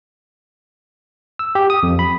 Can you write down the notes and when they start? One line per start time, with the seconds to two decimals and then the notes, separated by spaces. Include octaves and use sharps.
1.39 E6
1.55 G4
1.70 D#6
1.83 F2
1.99 B5